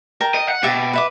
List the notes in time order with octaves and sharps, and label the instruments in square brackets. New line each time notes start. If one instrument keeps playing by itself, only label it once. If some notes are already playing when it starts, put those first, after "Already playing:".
[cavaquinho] A#4 G5 A5
[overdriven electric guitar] D#5
F#5
[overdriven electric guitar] B2 [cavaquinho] G4 E5 A5
[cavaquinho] B4 E5 D6